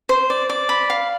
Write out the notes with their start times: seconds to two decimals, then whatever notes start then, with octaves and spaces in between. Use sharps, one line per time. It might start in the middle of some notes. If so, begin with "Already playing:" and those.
0.09 C5
0.30 D5
0.50 D5
0.69 B5
0.90 F5